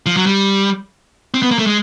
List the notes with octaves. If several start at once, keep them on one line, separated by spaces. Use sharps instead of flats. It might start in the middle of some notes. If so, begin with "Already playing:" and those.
F3
F#3
G3
C4
B3
A#3
A3
G#3